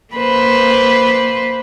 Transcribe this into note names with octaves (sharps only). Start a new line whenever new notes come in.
A#3 B4 C5